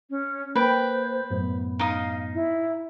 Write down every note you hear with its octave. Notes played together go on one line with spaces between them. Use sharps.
C#4
A#3 B4 C5 G5
F#2 A2 B3
D#4 F5 D#6
E4